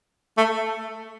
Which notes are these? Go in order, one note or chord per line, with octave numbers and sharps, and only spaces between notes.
A3